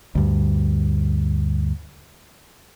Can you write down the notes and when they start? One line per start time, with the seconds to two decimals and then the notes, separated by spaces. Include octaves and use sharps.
0.15 D2 G2